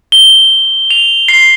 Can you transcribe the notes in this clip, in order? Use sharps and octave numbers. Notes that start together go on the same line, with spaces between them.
G7
F7
C7